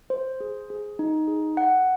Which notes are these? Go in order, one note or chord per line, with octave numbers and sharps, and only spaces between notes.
C5
G#4
G#4
D#4
G#4
F#5